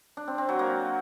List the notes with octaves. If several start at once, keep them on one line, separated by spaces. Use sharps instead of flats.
D4
C4
C4
F#3
A#3